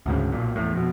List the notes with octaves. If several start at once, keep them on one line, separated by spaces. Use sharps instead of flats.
D2 G#2 C#3
B1 A#2
E2 A2
F2 B2